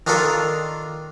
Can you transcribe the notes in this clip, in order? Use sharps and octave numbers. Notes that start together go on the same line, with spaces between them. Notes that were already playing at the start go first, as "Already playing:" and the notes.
D#3 D4 D#4 F4 A4 A#4